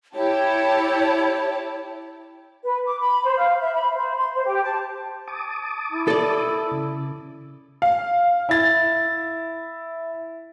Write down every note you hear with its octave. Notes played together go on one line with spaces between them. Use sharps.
E4 G4 C#5 A5
B4
D6
B5
C5
F5
E5
B5
C5
C6
C5
G4
A5
A5 D6 D#6
E4
A4 D5
C#3
F5
E4 A6